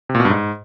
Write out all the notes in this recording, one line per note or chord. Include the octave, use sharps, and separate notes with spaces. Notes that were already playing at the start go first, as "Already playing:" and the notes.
C3
A#2
B2
G2
G#2